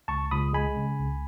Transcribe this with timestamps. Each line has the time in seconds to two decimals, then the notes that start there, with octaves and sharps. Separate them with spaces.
0.08 C#2 A5 C#6
0.31 C#2 B5 D#6
0.53 G#3 G#5 B5
0.77 C#3
1.00 C#2